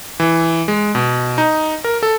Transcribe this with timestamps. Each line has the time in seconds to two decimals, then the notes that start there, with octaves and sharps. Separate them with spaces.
0.20 E3
0.68 G#3
0.95 B2
1.38 D#4
1.84 A#4
2.03 A4